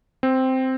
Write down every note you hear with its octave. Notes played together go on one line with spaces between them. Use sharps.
C4